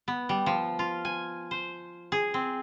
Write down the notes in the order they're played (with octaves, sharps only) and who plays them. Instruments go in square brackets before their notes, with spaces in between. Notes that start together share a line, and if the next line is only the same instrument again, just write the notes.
[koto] B3
G3
F3
F4
G#5
C5
G#4
C4